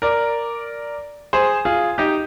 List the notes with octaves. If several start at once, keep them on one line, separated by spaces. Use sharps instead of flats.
A#4 D5
G#4 C5
F4 G#4
D#4 G4